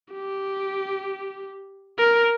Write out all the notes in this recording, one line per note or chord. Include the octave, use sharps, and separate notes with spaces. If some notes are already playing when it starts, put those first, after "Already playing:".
G4
A#4